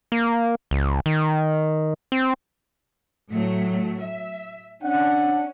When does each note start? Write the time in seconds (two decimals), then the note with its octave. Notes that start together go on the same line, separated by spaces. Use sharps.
0.12 A#3
0.71 C#2
1.06 D#3
2.12 C4
3.30 A2 F#3 A3
4.00 E5
4.83 C#4 D4 F#5